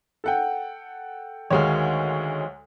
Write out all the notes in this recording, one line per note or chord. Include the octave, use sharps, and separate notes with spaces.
A4 F#5 G5
D2 D#3 G#3 F#4 C#5 F5